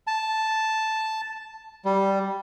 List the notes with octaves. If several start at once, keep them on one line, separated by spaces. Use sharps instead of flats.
A5
G3